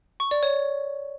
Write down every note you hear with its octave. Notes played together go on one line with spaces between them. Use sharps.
C#6
D5
C#5